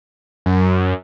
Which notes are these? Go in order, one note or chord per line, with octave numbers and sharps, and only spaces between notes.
F#2